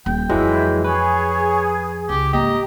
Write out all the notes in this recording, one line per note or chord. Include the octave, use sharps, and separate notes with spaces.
D#1 G5
F2 E3 F#3 G#3 E4
G#4 B4 C#5
C#2 G4
G#1 A#3 G4 D#5 A#5